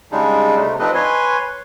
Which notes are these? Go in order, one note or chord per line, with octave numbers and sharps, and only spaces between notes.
C#3 G3 G#3 D4 D#4
C3 A3
F3 C4 D4 D#4 B4 D#5
B4 C#5 G#5 C6